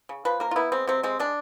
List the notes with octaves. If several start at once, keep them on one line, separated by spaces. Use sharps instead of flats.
C#3
F3 B4
A#3 A#4
F4
B3 E4
G#3 C4
C3 C4
G#3 C4
G#3 D4